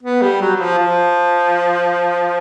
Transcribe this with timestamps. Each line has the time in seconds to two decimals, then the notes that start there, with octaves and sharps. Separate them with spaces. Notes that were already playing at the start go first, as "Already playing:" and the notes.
0.03 B3
0.22 G3
0.41 F#3
0.56 F#3
0.60 F3
0.79 F3